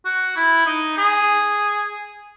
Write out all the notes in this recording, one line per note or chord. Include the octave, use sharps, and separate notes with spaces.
F#4
E4
D#4
G#4